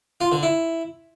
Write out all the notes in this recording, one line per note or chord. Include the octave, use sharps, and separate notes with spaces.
F4
D3
E4